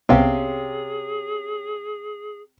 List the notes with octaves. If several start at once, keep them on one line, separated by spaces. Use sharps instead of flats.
C2 C3 B3 C#4 G4 G#4 F5